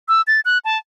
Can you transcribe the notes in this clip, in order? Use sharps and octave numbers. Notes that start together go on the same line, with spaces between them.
E6
A6
F#6
A5